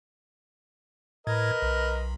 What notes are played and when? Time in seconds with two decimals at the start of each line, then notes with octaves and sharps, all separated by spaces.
1.27 A2 A#4 B4 D#5 G#6
1.62 B1